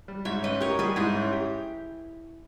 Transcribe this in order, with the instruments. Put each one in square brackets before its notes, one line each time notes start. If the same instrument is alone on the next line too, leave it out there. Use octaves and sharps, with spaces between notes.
[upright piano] G3
[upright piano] G#2 [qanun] C#5 E5
[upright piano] C#4 [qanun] B4 D#5
[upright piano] G4 [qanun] A#4 C#5
[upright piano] G3 [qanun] G#4 B4
[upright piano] G#2 [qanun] E4 G#4
[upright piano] C#4
G4